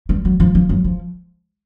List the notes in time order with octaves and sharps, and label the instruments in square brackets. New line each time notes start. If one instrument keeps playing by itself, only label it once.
[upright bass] G3
F#3
F3
F3
F#3
F3